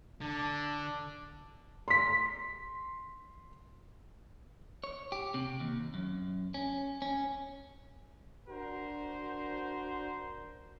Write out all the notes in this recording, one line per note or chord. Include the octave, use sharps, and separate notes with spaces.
D3 D4
C6 B6
C#5
G4
C3
D#2
F#2
C#4
C#4
D4 F#4 A#4 C5